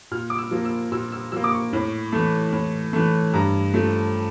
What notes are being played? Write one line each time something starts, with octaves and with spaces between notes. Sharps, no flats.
A#2 F6
D6
E6
F3 A#3
E6
A#2 E6
E6
F3 A#3 E6
D6
C#6
A2
E3 A3
A2
E3 A3
G2 A#5
F3 A3